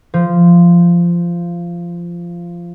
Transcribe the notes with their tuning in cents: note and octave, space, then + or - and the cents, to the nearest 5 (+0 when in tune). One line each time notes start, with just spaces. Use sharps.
F3 -15